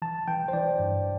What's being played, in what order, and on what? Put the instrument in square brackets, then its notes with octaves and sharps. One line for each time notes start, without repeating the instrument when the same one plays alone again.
[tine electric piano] E3 A5
E3 G5
C5
E3 D5
G2